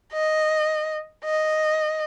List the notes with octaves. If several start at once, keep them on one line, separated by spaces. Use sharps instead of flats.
D#5
D#5